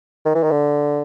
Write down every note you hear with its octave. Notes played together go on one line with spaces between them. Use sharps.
D#3
E3
D#3
D3